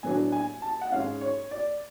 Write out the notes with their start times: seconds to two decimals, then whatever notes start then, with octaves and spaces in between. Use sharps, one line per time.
0.03 A2 F#3 B3 D4 G#5
0.32 G#5
0.62 A5
0.81 F#5
0.92 G#2 G#3 C#4 F5
1.21 C#5
1.51 D5